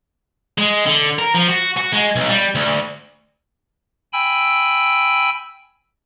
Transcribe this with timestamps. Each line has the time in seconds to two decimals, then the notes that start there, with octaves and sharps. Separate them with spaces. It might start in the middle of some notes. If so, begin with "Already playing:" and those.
0.58 G#3
0.86 D3
1.19 A#4
1.35 F3
1.48 F#4
1.77 F#4
1.93 G#3
2.16 B1
2.29 G3
2.55 D2
4.13 G5 G#5 B5 E6